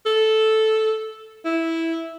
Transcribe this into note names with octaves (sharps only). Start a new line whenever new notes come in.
A4
E4